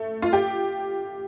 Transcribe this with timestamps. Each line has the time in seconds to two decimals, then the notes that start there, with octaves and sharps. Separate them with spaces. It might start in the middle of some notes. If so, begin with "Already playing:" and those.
Already playing: A3
0.22 F4
0.33 G4